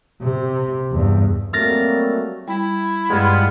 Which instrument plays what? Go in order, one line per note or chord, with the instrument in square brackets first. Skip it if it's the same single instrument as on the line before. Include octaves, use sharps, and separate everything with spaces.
[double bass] C3
E2 G2
[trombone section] F#3 G3 A3 [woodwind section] A#3 C4 [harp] F6 A6 A#6
[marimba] G3 [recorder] E4
[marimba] G2 G#6 [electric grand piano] G3 G#3 [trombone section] B3 F4